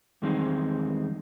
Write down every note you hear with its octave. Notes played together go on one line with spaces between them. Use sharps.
E2 D#3 G3 G#3 C4 D#4